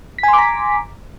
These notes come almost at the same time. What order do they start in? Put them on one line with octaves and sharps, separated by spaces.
B6 G#5 C6 D6 A#5